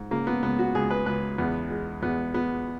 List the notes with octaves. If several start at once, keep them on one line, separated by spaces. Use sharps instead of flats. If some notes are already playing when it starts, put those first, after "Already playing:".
Already playing: G#2
C#3 A#3
B3
C#2 B3
F#4
C#2 G#4
B4
C#2 B4
E2 B3
G#3
E2 B3
G#3 B3